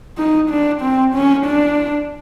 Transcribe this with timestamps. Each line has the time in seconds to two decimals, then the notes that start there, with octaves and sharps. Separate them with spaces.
0.18 D#4
0.50 D4
0.82 C4
1.15 C#4
1.46 D4